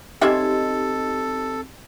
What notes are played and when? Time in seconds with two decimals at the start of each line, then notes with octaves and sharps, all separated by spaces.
0.21 G3 C4 C#4 D#4 G4 A4 D#5 E5